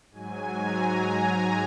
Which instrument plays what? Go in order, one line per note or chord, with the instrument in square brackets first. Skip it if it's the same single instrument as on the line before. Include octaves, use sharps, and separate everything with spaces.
[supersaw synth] G#2 F#3 G#5
A#5
G#5